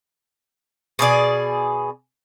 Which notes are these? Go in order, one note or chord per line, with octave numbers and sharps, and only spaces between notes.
B2 G#4 D5 G#5